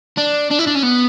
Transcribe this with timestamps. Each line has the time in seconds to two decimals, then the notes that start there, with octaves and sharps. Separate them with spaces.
0.17 D4
0.51 D4
0.59 E4
0.67 D4
0.75 C#4
0.83 B3